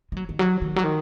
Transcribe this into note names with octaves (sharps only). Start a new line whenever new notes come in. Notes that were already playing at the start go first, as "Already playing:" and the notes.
G#3
F#3
D#3
F#3
D#3
F#3
D#3